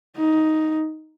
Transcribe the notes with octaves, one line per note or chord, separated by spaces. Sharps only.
D#4